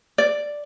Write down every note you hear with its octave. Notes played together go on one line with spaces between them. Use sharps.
D5